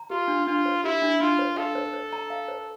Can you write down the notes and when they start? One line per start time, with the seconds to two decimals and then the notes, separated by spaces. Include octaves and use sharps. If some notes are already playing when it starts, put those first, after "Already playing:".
Already playing: A#5
0.10 F4 G4
0.28 D4
0.47 D4 F4
0.66 C5
0.83 E4 G4
1.02 D4
1.20 D4 F4
1.39 C5
1.56 A4 F5
1.75 C5
1.94 C5
2.13 A#5
2.30 F5
2.48 C5